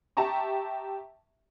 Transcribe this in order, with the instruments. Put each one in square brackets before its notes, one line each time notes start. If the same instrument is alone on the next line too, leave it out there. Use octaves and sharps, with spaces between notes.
[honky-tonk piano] G4 E5 A5 A#5 C#6